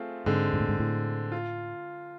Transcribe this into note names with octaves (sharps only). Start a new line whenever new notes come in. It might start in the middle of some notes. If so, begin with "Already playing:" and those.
Already playing: A3 C4 F4 G#4
G#2 D3 G#3 C4
G#2
A2
G#2
A2
F4